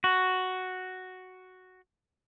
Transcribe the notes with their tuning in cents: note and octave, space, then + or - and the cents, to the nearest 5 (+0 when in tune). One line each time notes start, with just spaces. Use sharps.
F#4 +0